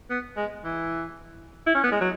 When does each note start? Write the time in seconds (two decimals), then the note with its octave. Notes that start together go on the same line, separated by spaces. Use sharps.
0.10 B3
0.36 G#3
0.64 E3
1.66 E4
1.74 C#4
1.84 B3
1.92 G#3
2.01 F#3